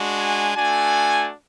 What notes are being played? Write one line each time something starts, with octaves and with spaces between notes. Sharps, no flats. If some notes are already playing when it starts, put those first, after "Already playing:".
Already playing: G#3 D4 F#4
G#5
A3 D4 F#4 G#5